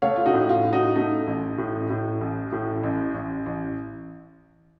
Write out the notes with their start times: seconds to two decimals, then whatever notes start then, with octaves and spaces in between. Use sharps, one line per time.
0.02 A3 C#5 F5
0.16 F4
0.26 D#4 F#4
0.34 A2
0.49 F4
0.65 A2
0.73 D#4 F#4
0.96 A3 D#4
1.27 A1
1.58 A2
1.90 A2
2.21 A1
2.52 A2
2.83 A1
3.14 A1
3.46 A1